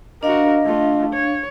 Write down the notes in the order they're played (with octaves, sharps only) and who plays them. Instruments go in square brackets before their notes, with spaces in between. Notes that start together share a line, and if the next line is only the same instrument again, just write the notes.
[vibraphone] D4 F5 [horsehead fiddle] F#4 A#4 [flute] D#5
[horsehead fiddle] A3 F4
C#5